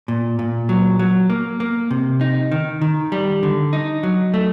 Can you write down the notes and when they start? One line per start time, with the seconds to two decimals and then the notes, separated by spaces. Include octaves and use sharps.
0.08 A#2
0.39 A#2
0.69 F#3
0.99 F#3
1.30 A#3
1.60 A#3
1.91 C3
2.21 D#4
2.52 D#3
2.82 D#3
3.12 G3
3.43 D3
3.73 D#4
4.03 F#3
4.34 A3